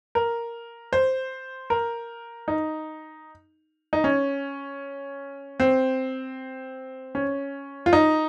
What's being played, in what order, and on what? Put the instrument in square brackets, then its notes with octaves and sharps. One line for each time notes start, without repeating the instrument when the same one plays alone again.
[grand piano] A#4
C5
A#4
D#4
D#4
C#4
C4
C#4
F4
D#4